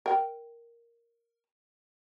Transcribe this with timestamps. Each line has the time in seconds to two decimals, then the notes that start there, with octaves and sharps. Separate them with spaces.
0.06 A#4 G5